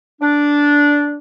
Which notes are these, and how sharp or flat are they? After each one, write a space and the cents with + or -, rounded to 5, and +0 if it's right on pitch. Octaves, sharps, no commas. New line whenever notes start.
D4 -10